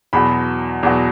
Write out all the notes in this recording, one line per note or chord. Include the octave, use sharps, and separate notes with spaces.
E2 B2 F#3 B5
E2 B2 F#3